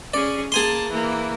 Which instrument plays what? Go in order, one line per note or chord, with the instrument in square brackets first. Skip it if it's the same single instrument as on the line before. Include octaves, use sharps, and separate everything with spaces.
[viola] C#4 G#4 [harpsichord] D5
[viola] A#3 A5 [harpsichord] G#4 G#5 C6
[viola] E3 A#3